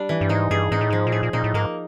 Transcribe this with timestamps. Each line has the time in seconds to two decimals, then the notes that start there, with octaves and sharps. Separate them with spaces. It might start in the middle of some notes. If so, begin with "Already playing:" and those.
Already playing: G3 D4
0.09 E3
0.21 G2
0.29 G#2 D#4
0.51 G2 G#4
0.71 G#2 D#4
0.81 A2
0.90 G#2 F3
1.07 A#2
1.12 A2 G#4
1.23 A#2
1.33 A#2 D#4
1.44 A2
1.54 G#2 A#3